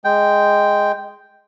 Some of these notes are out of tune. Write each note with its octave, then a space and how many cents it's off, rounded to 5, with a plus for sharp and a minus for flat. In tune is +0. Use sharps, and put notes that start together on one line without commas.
G#3 +0 G5 +0